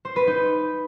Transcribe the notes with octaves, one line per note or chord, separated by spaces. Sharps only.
C5
B4
D#4